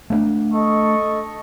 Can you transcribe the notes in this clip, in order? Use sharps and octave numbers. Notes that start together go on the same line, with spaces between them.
A3 B3 D4
A4 D#5 C#6